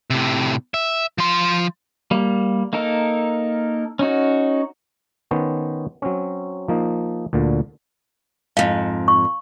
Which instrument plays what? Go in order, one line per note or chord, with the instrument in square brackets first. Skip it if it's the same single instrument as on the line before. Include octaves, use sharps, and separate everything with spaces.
[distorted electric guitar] A2 C3
E5
F3 C6
[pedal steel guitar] G3 A#3
A#3 D#4 A4 A#4
C#4 D#4 F#4
[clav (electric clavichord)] D#3 B3 C#4 C5
F#3 C4 C#4
F3 A#3 D#4
D2 A#2 D3
[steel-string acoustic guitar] F2 G#2 [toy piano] F5
[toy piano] C#6